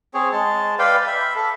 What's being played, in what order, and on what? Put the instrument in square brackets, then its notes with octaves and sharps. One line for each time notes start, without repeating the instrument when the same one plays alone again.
[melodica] C4 G#4 C#5
G#3 A5
B4 D5 F5 G5
E5 B5
A4